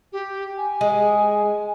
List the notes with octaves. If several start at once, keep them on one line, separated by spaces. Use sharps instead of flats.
G4
G#5
G#3